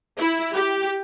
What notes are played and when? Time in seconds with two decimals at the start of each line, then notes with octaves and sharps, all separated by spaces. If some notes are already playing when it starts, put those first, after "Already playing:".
0.19 E4
0.54 G4